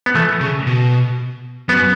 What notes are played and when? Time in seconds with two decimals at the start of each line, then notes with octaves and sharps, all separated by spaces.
0.06 B3
0.15 E3 A3
0.41 C#3
0.66 B2
1.68 F#2 B3